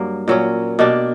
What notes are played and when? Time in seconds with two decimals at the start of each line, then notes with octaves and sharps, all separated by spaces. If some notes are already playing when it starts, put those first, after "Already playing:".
Already playing: G2 F#3 A#3
0.28 A#2 F#3 C#4
0.79 B2 A#3 D4 G4